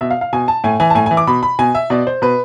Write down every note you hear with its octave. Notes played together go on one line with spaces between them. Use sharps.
B2 E5
F5
F5
B2 G#5
A5
A2 G#5
E3 G#5
A5
A2 G#5
E3 G#5
D6
B2 B5
B5
B2 G#5
E5
B2 D5
C5
B2 B4